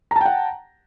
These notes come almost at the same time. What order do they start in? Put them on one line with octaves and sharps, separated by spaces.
A#5 A5 G5 F#5